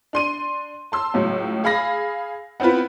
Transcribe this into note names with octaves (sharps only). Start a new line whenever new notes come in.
D4 C6 D#7
A5 C6 E6
C#2 A2 F#3
G#4 F5 B5 A#6
B3 C4 E4 F4 B4